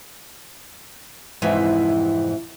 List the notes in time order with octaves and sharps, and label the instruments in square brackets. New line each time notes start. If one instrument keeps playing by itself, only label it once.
[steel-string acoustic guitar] F2 G#2 C3 E3